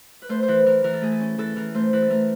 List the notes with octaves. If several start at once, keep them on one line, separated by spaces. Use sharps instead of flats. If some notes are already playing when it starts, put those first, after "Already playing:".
B4
A3 C5
C5
E3 B4
E3 A#4
E3 A#4
A4
A3 G#4
A4
C#4
E3 A4
E3 A#4
A3 C5
E3 B4
A4
A3 A#4